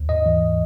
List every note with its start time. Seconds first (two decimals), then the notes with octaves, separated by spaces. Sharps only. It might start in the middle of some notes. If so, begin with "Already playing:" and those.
Already playing: D#2
0.09 G#2 D#5
0.26 E3